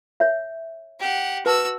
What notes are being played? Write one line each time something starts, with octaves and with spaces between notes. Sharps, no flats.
C#5 E5
G4 F#5
F#4 B4 A5 E6